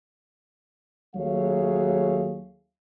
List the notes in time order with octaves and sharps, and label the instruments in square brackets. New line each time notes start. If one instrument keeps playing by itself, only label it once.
[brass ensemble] D#2 F#3 A3 G#4 C#5 F5